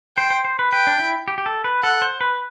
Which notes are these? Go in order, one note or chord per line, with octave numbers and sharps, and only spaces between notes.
C5 G5
C5
C5
B4
B4 G5
D4
E4
G4
G4
A4
B4
A4 F#5
C5
B4